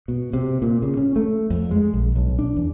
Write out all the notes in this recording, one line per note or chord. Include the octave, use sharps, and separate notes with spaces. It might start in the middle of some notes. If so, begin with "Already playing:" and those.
B2
C3
A#2
C#3
C#4
A3
F2
G#3
A#1
B1
D4
E2